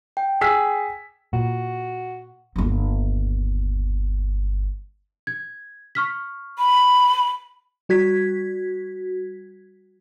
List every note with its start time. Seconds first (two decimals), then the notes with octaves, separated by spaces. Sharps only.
0.17 G5
0.41 G#4 E6 B6
1.33 A#2 F#4
2.56 G1 D#2
5.27 G#6
5.95 C#6 F6 B6
6.58 B5
7.89 G3 F#4 G#6 B6